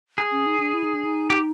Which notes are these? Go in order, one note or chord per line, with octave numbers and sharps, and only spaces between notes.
G#4
C#4
D#4
D4
E4
D#4
D4
D#4
G4